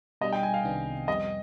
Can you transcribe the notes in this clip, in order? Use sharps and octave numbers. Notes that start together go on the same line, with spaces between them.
B2 G3 D4 D#5
G5
G#5
F5
C2 C3 D#3 B3 D4
F2 C3 G3 B3 D#5